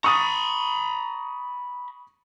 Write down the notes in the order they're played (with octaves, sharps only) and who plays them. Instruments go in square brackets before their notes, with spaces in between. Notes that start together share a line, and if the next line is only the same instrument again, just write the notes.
[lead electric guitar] A#5 B5 [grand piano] C#6 D#6 A6